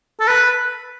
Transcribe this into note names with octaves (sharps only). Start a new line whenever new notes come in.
A4
B4